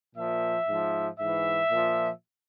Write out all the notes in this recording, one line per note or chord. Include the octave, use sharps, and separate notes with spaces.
A#2 F3 E5
G#2 F3
G#2 E3 E5
A#2 F3